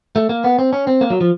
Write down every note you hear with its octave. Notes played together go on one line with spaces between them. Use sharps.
A3
A#3
B3
C4
C#4
C4
A#3
F#3
F3